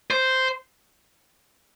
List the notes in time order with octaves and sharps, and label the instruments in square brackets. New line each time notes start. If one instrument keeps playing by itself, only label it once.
[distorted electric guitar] C5